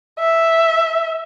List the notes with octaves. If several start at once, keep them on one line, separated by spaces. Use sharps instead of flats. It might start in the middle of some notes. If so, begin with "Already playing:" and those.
E5